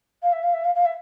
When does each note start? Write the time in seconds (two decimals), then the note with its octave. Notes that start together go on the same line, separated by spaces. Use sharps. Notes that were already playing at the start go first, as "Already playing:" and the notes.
0.22 F5
0.32 E5
0.42 F5
0.53 E5
0.64 F5
0.75 F5
0.85 E5